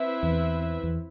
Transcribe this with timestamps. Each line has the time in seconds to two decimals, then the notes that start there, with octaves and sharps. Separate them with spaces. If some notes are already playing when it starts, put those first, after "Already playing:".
Already playing: C4 E4 B4 E5
0.23 E2
0.83 E2